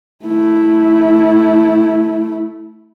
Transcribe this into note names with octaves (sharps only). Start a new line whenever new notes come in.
A3 E4